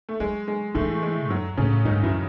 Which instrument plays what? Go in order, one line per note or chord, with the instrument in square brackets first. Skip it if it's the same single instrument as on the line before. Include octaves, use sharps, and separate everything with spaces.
[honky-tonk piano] A3
[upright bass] F#3 [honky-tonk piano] G#3
[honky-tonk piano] G#3
[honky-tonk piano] A2 A3 [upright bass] E3
[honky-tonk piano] G#3
[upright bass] F#2 [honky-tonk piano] F#3
[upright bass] A2 [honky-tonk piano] C#3 C#4
[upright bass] G#2 [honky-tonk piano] D#3 D#4
[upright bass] F#2 [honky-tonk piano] E3 E4